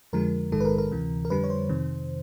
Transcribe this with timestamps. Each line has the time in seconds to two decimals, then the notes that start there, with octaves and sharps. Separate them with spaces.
0.13 F2 D3 F3 G#3 A#4
0.52 A#1 G#2 D#3 G#3 A4
0.60 B4
0.65 A#4
0.78 A#4
0.92 D2 C3 E3
1.25 A#4
1.30 F2 D3 G3 B4
1.44 C#5
1.50 C5
1.69 F2 C3 D#3